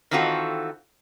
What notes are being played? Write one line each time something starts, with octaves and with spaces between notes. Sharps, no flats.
D#3 E3 C4 F4 F#4 A4